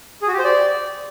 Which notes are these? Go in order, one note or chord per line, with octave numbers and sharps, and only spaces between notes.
G#4
F#4
G4
C5
D5